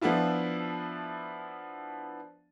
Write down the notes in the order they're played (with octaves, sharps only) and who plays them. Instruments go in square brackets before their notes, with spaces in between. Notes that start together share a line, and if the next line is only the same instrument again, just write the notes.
[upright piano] F3 B3 D4 E4 F4